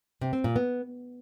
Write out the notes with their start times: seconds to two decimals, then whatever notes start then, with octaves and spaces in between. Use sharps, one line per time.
0.21 C3
0.33 C4
0.44 A#2
0.56 B3